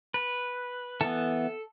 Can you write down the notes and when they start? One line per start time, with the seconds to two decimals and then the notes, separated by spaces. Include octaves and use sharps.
0.14 B4
1.01 E3 B3 A4